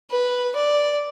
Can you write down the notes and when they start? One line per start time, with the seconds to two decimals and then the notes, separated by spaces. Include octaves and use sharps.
0.11 B4
0.56 D5